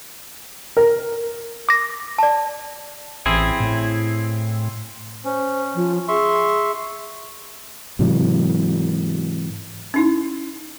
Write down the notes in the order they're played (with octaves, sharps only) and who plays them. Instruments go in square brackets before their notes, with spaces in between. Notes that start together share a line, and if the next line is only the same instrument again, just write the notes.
[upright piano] A#4
[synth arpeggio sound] D6 A#6
[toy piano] D5 A5
[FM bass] A1 [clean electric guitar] C4 E4 G#4
[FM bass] A2
[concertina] C#4 [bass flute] C5
[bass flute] F3
[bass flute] G#4 [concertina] E5 C6 C#6
[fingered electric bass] G#2 C3 E3 F#3
[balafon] C#4 D#4 E4